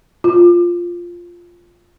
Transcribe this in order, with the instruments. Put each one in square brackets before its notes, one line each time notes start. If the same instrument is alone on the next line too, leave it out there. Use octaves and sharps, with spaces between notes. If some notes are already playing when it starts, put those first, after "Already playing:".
[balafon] F4